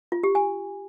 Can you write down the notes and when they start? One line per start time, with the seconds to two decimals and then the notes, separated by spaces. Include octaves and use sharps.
0.12 F4
0.23 G4
0.35 G#5